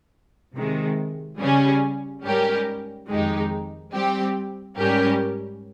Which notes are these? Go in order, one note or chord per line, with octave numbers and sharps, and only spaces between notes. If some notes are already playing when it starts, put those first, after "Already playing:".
C3 D#3 G#3
C#3 G3 C#4 G#4
G#2 G3 C#4 G4 A#4
F2 D#3 G#3 D#4 G4
G3 C4 G4
G#2 G3 C#4 G4 A#4